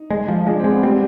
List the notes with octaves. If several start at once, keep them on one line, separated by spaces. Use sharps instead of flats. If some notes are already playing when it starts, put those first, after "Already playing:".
Already playing: D#4
G#3
F3
G#3 D4
C4
G#3
B3
G3 C4